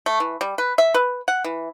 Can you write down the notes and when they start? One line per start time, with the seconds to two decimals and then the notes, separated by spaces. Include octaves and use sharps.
0.06 A3
0.20 E3
0.41 G3
0.58 B4
0.78 E5
0.94 B4
1.28 F#5
1.44 E3